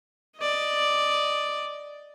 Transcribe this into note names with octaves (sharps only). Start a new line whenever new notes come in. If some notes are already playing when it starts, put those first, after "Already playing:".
D5 D#5